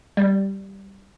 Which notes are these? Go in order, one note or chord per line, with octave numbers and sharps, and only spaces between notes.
G3